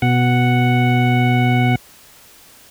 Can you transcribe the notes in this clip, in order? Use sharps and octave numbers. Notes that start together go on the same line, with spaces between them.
B2 F#5